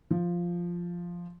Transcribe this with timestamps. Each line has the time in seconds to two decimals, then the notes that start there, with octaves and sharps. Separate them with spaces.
0.11 F3